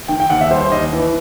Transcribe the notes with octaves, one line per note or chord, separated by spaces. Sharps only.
D#3 G5
G5
D#2 F#5
E5
G3 C5
C5
D#2 D#5
E3